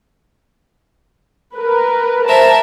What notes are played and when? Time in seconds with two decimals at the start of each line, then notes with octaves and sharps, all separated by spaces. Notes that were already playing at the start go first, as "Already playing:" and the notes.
1.54 A#4 B4
2.27 A#4 C5 E5 A5